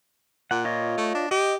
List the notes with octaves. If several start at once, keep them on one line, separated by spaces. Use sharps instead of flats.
A#2 F#5
F4 C#5 D#5
A3
D4
G4 D#5